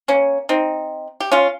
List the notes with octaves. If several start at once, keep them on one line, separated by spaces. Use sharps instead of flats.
A#3 C#4
C4 D#4
G4
C#4 F4